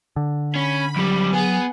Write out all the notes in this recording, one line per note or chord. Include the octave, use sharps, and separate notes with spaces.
D3
C#4 B5
F2 F#3 G3
B3 G#4